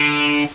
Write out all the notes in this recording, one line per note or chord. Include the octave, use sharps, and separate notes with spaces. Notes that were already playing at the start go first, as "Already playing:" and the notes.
Already playing: D3